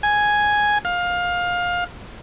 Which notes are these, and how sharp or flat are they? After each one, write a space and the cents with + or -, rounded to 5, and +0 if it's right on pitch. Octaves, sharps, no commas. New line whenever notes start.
G#5 +0
F5 +20